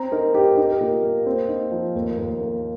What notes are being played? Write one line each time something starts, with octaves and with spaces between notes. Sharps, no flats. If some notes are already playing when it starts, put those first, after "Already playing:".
Already playing: C4 A#5
D#4 A#4
D#4 G4
D#4 A#4
G4
A#4
A#2
A#3
C4
D#4
F3
D#2
D#2
A#3